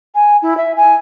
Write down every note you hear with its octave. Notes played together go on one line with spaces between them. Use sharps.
G#5
E4
E5
G#5